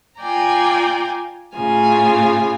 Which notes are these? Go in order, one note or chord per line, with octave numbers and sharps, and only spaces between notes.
F4 D5 G5 G#5 A#5
A2 C#3 F4 G#5